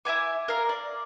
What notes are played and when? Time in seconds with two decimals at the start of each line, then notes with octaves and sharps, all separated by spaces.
0.05 E4 E5 G#5 D6
0.48 A#4 D5 F5 A#5
0.69 D5